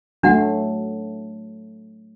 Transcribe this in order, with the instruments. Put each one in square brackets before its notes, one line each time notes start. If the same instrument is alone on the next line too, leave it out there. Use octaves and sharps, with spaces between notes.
[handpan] F#3 A3 [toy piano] D4 F#4 F#5